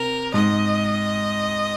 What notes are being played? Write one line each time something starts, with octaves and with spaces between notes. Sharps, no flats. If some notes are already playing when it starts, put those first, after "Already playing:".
Already playing: C3 A#4
G#2 D#5